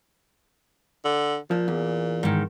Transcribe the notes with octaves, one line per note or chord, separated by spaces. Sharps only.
D3
A#2 F3
E2
G#2 D#3